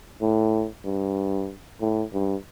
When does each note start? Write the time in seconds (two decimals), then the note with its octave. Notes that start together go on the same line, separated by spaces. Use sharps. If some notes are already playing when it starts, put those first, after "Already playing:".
0.22 A2
0.85 G2
1.81 A2
2.13 G2